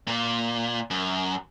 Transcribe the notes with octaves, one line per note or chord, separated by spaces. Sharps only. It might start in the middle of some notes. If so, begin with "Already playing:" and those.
A#2
F#2